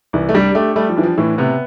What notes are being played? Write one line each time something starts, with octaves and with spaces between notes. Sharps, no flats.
C2 E3
A3
G3 D4
A3 G4
G3 A3
F3
E3 D4
F3
A2 E3
C3 B3